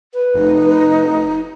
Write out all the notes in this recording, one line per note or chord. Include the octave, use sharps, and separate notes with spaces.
B4
F1 D#4